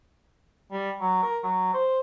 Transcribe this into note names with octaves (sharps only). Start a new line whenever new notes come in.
G3
F#3
A#4
F#3
C5